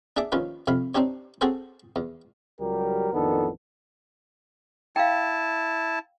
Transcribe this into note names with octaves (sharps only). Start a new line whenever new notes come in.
D4 G#4 D5 E5 D6
D#2 F3 C#4 F4 B4
F2 C3 F5 B5
C4 D4 D#4 G4 C#5
C4 F#4 G#4 A4 C5
E2
C#2 F#3 G3 G4 A#4
A1 F2 D#3 B3 D4 A4
E4 F5 G5 A5